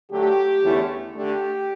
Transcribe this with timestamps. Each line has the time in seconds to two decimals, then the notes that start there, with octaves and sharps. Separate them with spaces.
0.11 D3 F#3 A3 G4
0.63 E2 D3 A3 C#4 E4
1.14 D3 A3 D4 G4